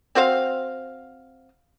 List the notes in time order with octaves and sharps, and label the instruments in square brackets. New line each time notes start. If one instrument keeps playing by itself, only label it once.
[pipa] C4 F#4 C5 F5